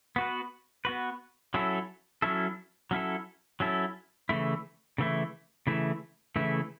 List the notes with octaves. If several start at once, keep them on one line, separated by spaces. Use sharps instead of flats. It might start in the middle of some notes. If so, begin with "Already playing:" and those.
B3 F#4 B4
B3 F#4 B4
F#3 C#4 E4 A4
F#3 C#4 E4 A4
F#3 C#4 E4 A4
F#3 C#4 E4 A4
C#3 E3 A3 E4
C#3 E3 A3 E4
C#3 E3 A3 E4
C#3 E3 A3 E4